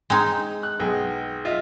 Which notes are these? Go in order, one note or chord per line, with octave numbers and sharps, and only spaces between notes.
G#3 C4 D#4
F#6
B1 G#4 G5
F4 D#5 E5